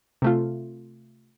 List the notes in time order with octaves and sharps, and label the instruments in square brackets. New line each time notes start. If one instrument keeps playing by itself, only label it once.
[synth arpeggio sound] C3 A3 F4